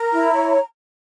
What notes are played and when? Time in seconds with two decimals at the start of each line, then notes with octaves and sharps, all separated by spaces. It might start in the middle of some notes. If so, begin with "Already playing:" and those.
Already playing: A#4 A#5
0.12 E4
0.32 C#5